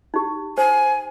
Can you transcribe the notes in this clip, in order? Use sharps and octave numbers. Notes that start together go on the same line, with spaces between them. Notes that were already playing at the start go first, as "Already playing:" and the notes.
D#4 G4
C5 G#5